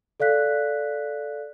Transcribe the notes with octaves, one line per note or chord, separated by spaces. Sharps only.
A4 D5 F5 F#6 B6